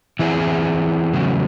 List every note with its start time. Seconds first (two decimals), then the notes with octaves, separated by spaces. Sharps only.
0.19 E3 C4 E4 G#4
1.13 E2 C#3 F#3 A3